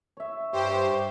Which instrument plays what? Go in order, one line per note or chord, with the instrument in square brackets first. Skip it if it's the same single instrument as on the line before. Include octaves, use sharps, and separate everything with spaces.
[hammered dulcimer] C#5 E5
[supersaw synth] G2 G4 C5 [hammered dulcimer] C#5